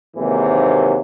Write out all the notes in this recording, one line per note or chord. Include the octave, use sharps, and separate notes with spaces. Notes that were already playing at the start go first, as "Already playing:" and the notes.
D#2 G#2 C3 E3 F#3 A#3